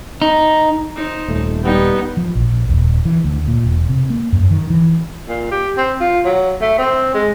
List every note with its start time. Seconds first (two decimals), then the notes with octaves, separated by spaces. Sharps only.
0.22 D#4
0.96 D#4 C5
1.29 D#1 A3
1.64 G3 B3 D#4 G5
2.17 F3
2.35 A#1
2.69 D#1
3.05 E3
3.24 D2
3.48 A#2
3.64 E1
3.89 C3
4.10 A#3
4.32 F#2
4.51 D#3
4.70 E3
5.28 A#2
5.51 G4
5.77 C4
6.00 F4
6.25 F#3
6.61 A3
6.78 C4
7.14 G#3